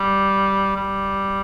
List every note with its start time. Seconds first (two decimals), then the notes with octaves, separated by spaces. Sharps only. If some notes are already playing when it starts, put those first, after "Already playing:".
Already playing: G3
0.76 G3